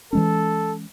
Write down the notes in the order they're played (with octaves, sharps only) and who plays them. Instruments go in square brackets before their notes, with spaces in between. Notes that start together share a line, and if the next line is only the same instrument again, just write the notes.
[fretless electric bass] E3 G#3 C#4 [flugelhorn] A4